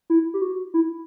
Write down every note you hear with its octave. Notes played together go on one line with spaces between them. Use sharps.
E4
G4
F#4
E4